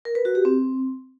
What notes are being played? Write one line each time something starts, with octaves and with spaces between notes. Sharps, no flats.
A#4
B4
F#4
G4
C4